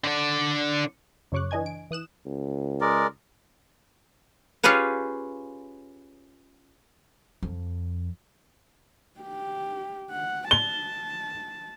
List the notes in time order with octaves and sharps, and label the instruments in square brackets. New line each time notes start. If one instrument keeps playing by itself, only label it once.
[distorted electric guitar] D3 D5
[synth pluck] F#2 C#3 C#5 C#6 D6 F#6
E3 D4 D#5 G#5 G#6
D7
E3 D#6 F#6 E7
[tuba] C#2
[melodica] G#3 A#4 D5
[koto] C#4 F4 G4 G#4 B4 C#5
[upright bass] F2
[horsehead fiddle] G4
F#5
[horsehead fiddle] A5 [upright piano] G7